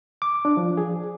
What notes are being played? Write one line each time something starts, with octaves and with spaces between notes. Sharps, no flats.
D6
D4
F3
G#4